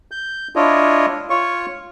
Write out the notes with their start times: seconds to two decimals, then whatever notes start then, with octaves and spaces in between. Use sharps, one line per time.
0.11 G6
0.56 D4 E4 F4 C#5 D#5
1.30 F4 C#5 C#6